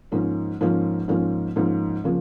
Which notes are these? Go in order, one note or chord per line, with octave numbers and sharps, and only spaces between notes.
G#2 F3 A#3 C#4
G#2 F3 A#3 C#4
G#2 F3 A#3 C#4
G#2 F3 A#3 C#4
C#3 F3 A#3